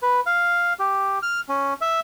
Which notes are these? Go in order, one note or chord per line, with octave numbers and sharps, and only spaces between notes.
B4
F5
G4
F6
C#4
E5